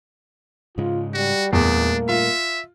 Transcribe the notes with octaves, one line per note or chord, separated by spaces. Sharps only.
G#2 C#3 G#3 F4
G3 F#4
E2 A#2 G3 A3 A#3 D4
F4 E5